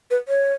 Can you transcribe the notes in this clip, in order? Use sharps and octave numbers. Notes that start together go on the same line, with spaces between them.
B4
C#5